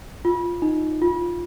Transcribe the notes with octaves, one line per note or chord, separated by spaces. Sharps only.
F4
D#4
F4